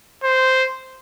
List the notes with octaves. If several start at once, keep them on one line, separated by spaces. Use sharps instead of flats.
C5